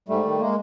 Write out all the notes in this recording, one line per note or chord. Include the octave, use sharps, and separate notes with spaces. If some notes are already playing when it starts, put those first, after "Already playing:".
G#2 G3 A3
D#3
G#3 A#3